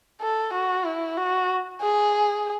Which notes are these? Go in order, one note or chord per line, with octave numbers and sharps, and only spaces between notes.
A4
F#4
E4
F#4
G#4